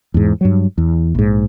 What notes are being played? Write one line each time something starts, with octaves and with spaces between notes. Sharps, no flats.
E2 G#2
G2 F#3
E2
A#1 G#2